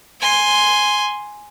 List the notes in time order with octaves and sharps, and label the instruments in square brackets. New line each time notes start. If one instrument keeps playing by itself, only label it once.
[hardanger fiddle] G#5 C6